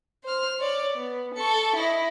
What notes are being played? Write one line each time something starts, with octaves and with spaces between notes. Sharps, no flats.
C5 F6
C#5 D5
B3
A4 C#6
E4 D#5